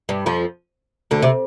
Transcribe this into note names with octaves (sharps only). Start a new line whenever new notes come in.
G2 G3
F2 F3
D2 D3
C3